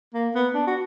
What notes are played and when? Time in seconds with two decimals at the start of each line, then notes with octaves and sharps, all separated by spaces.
0.14 A#3
0.35 B3
0.54 D4
0.67 F#4